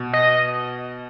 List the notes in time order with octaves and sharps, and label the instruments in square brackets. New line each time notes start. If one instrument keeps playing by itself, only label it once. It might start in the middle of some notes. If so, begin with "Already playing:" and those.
Already playing: [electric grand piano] B2
[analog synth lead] D#5